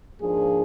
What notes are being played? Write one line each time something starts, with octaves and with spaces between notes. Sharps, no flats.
G#2 F3 A#3 D4 G#4